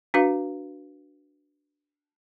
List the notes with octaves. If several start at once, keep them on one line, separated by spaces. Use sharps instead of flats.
D4 F#4 B4 F5